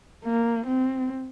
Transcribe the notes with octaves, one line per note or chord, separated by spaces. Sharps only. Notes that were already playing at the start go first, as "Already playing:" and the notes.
A#3
C4